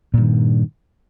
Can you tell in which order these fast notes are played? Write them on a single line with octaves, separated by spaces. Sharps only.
A#2 G2 D#3